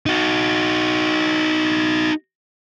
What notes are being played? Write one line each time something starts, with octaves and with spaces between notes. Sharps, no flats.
D#4 F#4